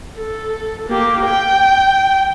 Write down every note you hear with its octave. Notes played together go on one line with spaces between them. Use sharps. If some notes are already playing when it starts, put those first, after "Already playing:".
A4
A#3 G4
G5